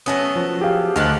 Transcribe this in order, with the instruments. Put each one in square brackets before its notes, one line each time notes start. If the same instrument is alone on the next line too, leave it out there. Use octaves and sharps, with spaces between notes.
[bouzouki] F#3 A3 B3 [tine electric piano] C#4 D#6
[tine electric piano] F3
[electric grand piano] G4 G#4 F5
[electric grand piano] D2 [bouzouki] D#3 F3 G4 [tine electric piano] F6 F#6